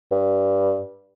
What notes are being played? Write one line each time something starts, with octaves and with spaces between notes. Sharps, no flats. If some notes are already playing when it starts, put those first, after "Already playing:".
G2